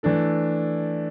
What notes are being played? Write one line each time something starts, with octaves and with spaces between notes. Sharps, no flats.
E3 A3 D4 A4